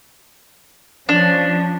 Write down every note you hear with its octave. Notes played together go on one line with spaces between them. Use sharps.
F3 C#4 D4